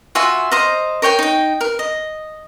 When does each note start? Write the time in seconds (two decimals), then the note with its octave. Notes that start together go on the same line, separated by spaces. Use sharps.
0.15 F4 F#4 E5 G#5
0.51 C5 D#5 F5 A#5
1.02 A#4 C#5 G5 G#5
1.19 D#4 G5
1.61 A#4
1.79 D#5